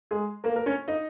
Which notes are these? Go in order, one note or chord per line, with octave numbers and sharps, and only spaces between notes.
G#3 G#4
A#3 A#4
A#4
C#4 C#5
D#4 D#5